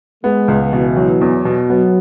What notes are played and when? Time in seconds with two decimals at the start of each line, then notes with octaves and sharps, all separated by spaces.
0.24 G#3 B3
0.48 C#2
0.72 B2 E3
0.97 F#3
1.21 E2
1.45 B2
1.69 F#3 B3